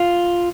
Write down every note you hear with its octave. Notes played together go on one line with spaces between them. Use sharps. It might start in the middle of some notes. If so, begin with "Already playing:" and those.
Already playing: F4